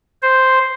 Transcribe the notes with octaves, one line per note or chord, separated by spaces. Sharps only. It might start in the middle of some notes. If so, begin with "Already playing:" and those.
C5